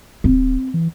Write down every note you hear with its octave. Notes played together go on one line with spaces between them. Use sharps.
D1 C4
E3